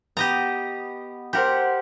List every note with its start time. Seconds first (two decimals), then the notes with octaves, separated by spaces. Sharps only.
0.17 B3 G4 D#5 A#5
1.33 G4 A#4 C5 F#5 B5